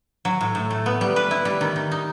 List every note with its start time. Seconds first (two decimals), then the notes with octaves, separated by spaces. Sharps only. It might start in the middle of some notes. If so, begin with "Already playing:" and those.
0.25 F#3
0.41 A2
0.55 A2
0.71 A3
0.86 B3
1.01 G3
1.16 B4
1.31 E4
1.45 G3
1.61 D#3
1.76 D#3
1.92 D#4